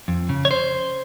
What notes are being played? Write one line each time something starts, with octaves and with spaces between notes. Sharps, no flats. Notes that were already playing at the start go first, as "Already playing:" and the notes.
F2
C#3
C#5
C5